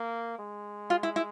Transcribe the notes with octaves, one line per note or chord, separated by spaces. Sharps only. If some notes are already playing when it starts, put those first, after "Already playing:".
Already playing: A#3
G#3
F4
E4
E4